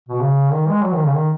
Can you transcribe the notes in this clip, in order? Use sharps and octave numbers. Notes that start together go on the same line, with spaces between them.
B2
C#3
D#3
G#3
F#3
D#3
C#3
D#3